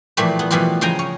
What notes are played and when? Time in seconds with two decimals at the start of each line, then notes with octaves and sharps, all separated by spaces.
0.17 A#2 E3 F3 G3 A3
0.39 B3
0.51 B2 E3 F3 G3 F4
0.81 C#3 F3 G5 G#5 A#5
0.99 C#4